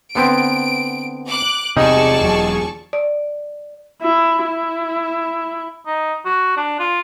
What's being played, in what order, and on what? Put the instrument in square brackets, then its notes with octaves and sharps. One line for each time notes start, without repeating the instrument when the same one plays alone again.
[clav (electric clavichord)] D3 B3 C4 [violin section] D7
[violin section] D6 F#6
[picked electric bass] E1 C3 [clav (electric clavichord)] G3 D#4 [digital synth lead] G#4 [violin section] D5 A5 C#6
[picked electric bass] E1 F#3
[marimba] D5
[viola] E4
E4
[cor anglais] D#4
F#4
D4
F4